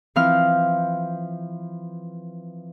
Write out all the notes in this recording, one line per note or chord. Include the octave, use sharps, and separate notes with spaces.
E3 F3 C4 F5 F6